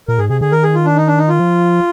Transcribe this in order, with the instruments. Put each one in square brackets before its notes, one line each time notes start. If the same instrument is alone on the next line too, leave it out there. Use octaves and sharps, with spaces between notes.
[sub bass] A#2 [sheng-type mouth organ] A#4
[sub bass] G#2 [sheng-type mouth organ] G#4
[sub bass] C3 [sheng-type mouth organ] G#4
[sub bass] D3 [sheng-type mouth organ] G#4
[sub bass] D#3 [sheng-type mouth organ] A#4
[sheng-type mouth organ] G#4
F4
D4
D#4
D4
D#4
F4
[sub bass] F3